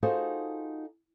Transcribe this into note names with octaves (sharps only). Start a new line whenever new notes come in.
D#4 F4 F#4 G#4 A4 C5